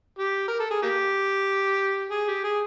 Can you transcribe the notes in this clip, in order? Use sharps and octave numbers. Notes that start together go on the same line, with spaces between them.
G4
A#4
A4
G#4
A#3 G4
G#4
G4
G#4